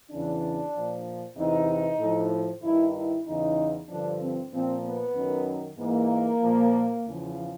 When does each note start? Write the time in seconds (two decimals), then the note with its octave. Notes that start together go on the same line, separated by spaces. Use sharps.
0.10 E2 C#3 E3 D4
0.74 A#2 F3
1.37 E2 C3 E3 D#4
2.00 A2 F3
2.62 G2 D#3 E4
2.94 E4
3.26 E2 C#3 E3 D#4
3.88 G2 D3 F3 D4
4.20 C4
4.52 A#2 F3 C4
4.84 B3
5.15 F#2 D#3
5.78 G#2 E3 A#3
6.41 A#2 F3
7.04 E2 C#3 F3